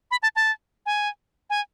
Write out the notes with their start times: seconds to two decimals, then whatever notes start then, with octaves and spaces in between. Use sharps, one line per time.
0.11 B5
0.23 A5
0.36 A5
0.86 G#5
1.50 G#5